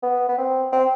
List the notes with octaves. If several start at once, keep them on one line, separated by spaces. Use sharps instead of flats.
B3
B3
C4
C4